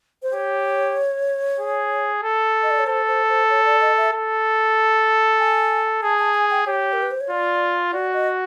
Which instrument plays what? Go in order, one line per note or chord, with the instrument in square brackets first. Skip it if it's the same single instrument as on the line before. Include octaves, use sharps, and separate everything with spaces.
[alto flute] C5
[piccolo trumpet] G4 [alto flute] C#5
[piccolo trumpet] G#4
A4
[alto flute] D#5
D5
C#5
[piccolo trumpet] A4 [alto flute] C5
[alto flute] C5
C5
C#5
D5
D#5
E5
[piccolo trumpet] A4
[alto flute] G#5
[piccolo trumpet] G#4 [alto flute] A5
[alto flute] A5
G#5
G5
[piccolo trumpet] G4 [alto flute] C#5
[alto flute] A#4
B4
C5
C#5
[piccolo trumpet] F4 [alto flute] D5
[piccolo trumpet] F#4 [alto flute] D5
[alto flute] D#5